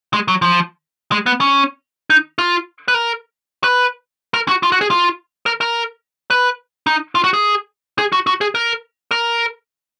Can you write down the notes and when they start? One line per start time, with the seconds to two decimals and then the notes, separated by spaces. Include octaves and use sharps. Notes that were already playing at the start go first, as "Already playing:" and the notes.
0.13 G#3
0.28 F#3
0.42 F3
1.12 G#3
1.26 B3
1.41 C#4
2.10 D#4
2.38 F4
2.88 B4
2.94 A#4
3.64 B4
4.34 A#4
4.48 F#4
4.63 F4
4.72 F#4
4.81 G#4
4.90 F4
5.46 A#4
5.61 A#4
6.30 B4
6.87 D#4
7.15 F4
7.24 F#4
7.34 G#4
7.99 G#4
8.12 F#4
8.27 F#4
8.41 G#4
8.55 A#4
9.11 A#4